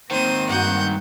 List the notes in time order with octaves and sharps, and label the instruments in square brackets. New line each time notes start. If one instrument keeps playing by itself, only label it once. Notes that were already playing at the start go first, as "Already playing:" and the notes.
[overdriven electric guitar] G#2 D#3 [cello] A#3 C4 [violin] C5 D#7
[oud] G2 F#4 [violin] F#5 G6